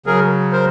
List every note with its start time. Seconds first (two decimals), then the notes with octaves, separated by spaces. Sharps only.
0.06 C#3 F#3 G#4 A#4
0.52 A#4 C5